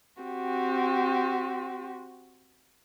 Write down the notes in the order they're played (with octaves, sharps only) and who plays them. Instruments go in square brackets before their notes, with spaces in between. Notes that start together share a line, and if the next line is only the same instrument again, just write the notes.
[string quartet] C4 F#4 G4